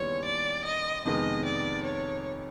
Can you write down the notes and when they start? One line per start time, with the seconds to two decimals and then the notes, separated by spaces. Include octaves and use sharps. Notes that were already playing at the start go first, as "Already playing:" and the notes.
Already playing: D#2 C#3 E3 G3 B3 C#5
0.25 D5
0.65 D#5
1.05 F2 C3 D#3 G#3 B3 D#5
1.45 D5
1.85 C#5